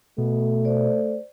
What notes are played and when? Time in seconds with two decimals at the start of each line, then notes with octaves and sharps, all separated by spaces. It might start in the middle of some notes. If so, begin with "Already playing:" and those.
0.18 B2 A3
0.65 C5 D5